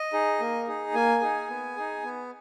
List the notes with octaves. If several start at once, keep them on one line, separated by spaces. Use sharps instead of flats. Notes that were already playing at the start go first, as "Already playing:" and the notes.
Already playing: D#5
D#4 G#4
A#3
D#4 G#4
A#3 G#5
D#4 G#4
B3
D#4 G#4
B3